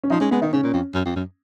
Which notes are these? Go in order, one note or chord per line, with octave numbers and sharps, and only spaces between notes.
C#4
F3 D#4
G#3 C#4
G#3 B3
D#3 D#4
C#3 C#4
A#2
F2
F#2
F2
F#2